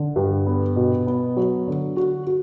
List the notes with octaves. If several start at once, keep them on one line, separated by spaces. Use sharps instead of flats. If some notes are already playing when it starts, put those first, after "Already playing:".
Already playing: D3
G2
B3
B2
B3
F#3
D3
F#4
F#4